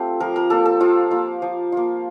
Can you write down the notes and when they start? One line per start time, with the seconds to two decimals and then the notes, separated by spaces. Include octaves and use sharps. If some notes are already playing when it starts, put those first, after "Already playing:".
Already playing: A3 C4 F4 G4 A4
0.20 F3 A#4
0.36 A#4
0.50 A#3 F4 A4
0.65 A4
0.80 F3 F4
1.11 A#3 F4
1.42 F3
1.72 A#3 F4